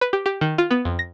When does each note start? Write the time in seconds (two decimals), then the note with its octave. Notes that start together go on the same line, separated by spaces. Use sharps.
0.01 B4
0.13 G4
0.26 G4
0.41 D#3
0.58 F4
0.71 B3
0.85 F2
0.99 A#6